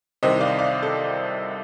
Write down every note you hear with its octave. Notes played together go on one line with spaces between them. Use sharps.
C2 C3 D#3 C5 D#5
D5 F5
D5 F5
A4